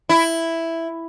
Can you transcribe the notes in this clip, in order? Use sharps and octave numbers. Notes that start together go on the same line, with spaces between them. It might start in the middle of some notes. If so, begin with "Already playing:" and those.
E4